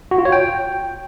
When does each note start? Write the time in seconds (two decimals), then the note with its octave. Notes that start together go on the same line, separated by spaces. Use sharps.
0.11 F#4
0.18 F4
0.25 C#5
0.32 G5